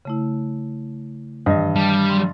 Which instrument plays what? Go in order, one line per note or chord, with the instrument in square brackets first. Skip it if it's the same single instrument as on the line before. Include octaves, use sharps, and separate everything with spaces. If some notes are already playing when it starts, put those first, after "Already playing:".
[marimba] C#3 A3 E4
[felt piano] G2 D#5 [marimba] D#3 E3 G3
[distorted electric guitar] G3 [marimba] A5
[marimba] F#3 C6